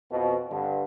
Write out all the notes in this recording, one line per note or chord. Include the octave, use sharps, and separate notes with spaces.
F2 B2
G2 D3